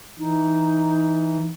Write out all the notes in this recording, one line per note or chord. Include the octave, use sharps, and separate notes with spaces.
E3 D#4